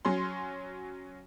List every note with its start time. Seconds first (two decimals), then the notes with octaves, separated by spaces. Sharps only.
0.05 F#3 C#4 C6